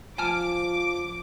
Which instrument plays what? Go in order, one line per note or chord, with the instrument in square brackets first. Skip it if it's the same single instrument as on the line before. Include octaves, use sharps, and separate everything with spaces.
[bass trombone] F3 [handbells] G#5 A5 F6 [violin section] D6